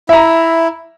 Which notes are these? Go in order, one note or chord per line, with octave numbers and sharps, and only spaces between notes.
E4 E5 A#5